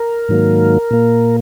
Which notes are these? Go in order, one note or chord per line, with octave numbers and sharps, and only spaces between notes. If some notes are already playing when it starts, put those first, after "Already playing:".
Already playing: A#4
G#2 D#3 F#3 A#3
A#2 A#3